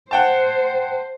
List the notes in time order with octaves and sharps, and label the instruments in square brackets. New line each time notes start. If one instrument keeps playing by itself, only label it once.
[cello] C5 [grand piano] F#5 G5 A5